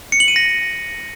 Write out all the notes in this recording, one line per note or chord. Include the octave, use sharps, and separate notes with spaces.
C#7
F#7
D#7
A#6